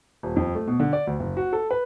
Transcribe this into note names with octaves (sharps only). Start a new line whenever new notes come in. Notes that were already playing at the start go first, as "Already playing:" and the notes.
D#1
F2
A3
B2
D3
D5
D2
F#1
F#4
A4
B4